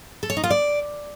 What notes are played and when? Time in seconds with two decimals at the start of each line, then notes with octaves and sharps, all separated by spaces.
0.23 A4
0.30 C#5
0.37 D#4
0.44 F4
0.50 D5